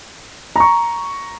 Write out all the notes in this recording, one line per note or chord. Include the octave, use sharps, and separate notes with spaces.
A#5 C#6